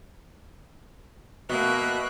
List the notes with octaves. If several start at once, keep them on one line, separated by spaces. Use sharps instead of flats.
B2 A#3 E5 F#6